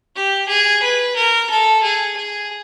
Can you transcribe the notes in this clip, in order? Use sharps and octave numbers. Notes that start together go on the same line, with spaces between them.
G4
G#4
B4
A#4
A4
G#4
G#4